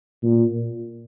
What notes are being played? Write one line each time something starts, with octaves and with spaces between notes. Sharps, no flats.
A#2